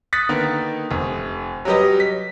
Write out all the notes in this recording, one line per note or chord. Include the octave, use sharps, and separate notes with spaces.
D#6 F#6 A6 B6 C#7
D3 D#3 A#3 B3
F1
F#3 G3 C#4 G4 B4 D#5
B6